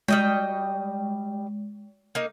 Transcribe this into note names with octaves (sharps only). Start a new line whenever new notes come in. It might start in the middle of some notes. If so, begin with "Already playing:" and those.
G3 G#3 D#5 G5
A#3 D#4